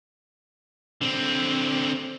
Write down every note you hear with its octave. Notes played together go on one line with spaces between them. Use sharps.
D3 C4